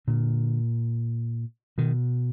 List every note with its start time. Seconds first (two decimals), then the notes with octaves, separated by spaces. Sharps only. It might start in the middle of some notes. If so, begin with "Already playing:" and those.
0.08 A#2 D3
1.78 B2 D#3